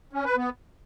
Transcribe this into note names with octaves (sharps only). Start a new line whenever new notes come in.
C#4
B4
B3